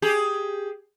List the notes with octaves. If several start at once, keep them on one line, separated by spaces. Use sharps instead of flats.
G4 G#4